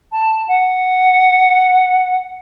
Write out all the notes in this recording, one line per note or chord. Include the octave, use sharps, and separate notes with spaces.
A5
F#5